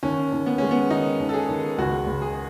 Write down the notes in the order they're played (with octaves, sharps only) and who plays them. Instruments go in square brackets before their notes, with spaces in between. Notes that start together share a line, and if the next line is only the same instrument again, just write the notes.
[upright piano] D#2 [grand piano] C#4
[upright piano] D#2
[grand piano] B3
[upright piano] G#3 [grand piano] C#4
[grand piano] B3
[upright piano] D#3 [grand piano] D#4
[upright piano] D#2
[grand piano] A4
G#4
[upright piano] D#2
[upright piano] C#2 [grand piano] F#4
[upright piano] C#2
[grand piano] G#4